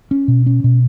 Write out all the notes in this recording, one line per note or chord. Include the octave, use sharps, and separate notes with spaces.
C#4
B2
C#4
B2